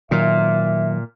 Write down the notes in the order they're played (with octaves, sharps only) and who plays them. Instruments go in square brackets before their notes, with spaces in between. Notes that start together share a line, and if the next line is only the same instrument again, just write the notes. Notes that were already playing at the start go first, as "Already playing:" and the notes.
[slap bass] A#2 [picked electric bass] D#3 F#3 [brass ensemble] E5